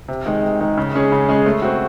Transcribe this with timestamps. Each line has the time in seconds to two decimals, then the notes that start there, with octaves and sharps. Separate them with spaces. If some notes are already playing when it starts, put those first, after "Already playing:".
0.08 C3
0.26 D#3 G#3 D#4
0.43 C3
0.60 D#3 G#3 D#4
0.78 C#3
0.94 G#3 C#4 G#4
1.12 C#3
1.29 G#3 C#4 G#4
1.46 A3
1.62 C4 F#4